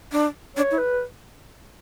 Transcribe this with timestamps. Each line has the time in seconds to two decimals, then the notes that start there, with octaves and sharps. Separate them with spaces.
0.12 D4
0.56 D4 C#5
0.71 E4
0.78 B4